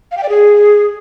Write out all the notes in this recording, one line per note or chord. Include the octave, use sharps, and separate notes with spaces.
F5
G5
D5
G#4